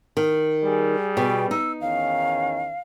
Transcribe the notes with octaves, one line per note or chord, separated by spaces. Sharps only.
D#3
G3 G#4
B2 G5
D#4 E6
E2 D#3 C#4 F5